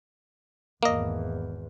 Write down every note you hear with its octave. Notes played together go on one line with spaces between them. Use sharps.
G#1 E2 A#3 D#5